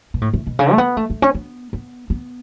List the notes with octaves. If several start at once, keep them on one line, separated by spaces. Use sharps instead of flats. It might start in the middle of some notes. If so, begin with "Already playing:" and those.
B2
A2
A2
B2
C#3
A3
B3
A3
A3
C#4
B3
B3
B3